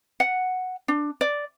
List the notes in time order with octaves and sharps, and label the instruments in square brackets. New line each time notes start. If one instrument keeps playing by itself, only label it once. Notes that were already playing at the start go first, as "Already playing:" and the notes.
[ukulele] F#5
D4
D5